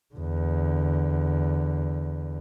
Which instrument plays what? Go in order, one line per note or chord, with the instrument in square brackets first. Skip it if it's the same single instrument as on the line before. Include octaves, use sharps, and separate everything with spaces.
[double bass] E2 D3